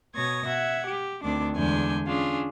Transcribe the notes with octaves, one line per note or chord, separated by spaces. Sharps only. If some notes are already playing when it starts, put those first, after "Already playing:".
B2 C#5 D#6 G#6 A#6
E5 F#5 G#6
G4
D2 D#3 C4 D4 D6
E2 D3 G#3 D4 G#5 G6
C#4 D4 F4 G#4